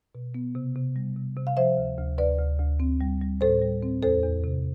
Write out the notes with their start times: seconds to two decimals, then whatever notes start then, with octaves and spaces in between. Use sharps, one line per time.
0.15 B2
0.34 B3
0.55 C3
0.75 C3
0.96 G3
1.16 C3
1.37 C3
1.47 F5
1.57 F3 C5 E5
1.78 D2
1.98 D2
2.18 D2 B4 D5
2.39 D2
2.60 D2
2.80 C4
3.01 G3
3.22 G3
3.41 A2 A4 C5
3.62 G3
3.82 C4
4.03 E2 A4 C5
4.23 E2
4.44 C3